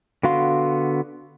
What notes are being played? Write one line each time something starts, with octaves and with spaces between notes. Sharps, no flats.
D3 B3 F#4 F5 C6